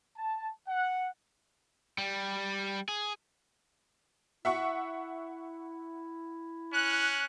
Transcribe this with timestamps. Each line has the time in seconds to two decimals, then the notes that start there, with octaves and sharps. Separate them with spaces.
0.17 A5
0.68 F#5
1.98 G3
2.88 G#4
4.45 E4 E5 F#5 C#6
6.73 C#4 F#6